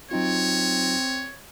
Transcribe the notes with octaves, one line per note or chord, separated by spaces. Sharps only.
F#3 C4 D#4 F4 C#5